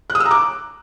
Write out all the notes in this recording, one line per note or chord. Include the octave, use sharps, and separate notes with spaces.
F#6
D#6
E6
A#5
D6